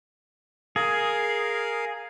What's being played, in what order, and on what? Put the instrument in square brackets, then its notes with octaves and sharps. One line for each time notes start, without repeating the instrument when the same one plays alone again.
[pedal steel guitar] G#4 [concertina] A#4 F5